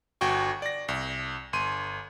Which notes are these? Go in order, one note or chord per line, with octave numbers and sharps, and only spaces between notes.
G1 F#4 G5 C#6
D5 A#6
C2
G1 C6 D#7